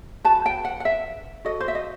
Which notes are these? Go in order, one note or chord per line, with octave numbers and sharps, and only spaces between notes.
F#4 B4 A5
G5
F#5
F#5
E5
F#4 A4 D#5
C5
E5
D#5